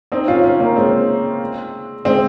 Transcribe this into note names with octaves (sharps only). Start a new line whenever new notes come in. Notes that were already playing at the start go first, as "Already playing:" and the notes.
C4 D#4
C#4 F4
C#4 F4
A#3 C#4
G#3 C4
G#3 C4